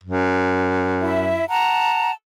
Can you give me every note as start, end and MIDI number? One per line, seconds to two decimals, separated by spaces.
0.03 1.44 42
1.00 1.44 64
1.00 1.44 76
1.48 2.12 78
1.48 2.12 81
1.48 2.12 82